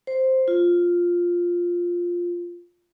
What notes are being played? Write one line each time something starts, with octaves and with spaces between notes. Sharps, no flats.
C5
F4